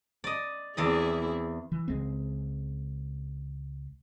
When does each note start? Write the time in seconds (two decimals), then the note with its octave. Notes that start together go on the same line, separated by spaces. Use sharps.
0.24 D5 D#5
0.77 E2 C4 E4 G#4 D5 D#5
1.72 E3
1.88 C#2 G#3 C4